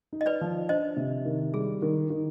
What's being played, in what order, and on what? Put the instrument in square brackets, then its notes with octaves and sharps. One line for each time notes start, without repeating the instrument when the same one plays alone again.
[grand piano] D#4
[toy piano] D#5
B4 D5
[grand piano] F3
[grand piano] D4 [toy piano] C5 D#5
[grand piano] C3
D#3
[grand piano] G3 [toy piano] G#4
[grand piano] D#3
D#3